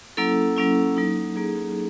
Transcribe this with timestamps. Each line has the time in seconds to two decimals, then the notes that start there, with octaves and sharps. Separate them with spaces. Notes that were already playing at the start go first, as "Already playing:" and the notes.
0.17 F#3 A#3 C#4 E4 A4
0.57 F#3 A#3 C#4 E4
0.97 F#3 A#3 D#4
1.36 F#3 A#3 D#4 G#4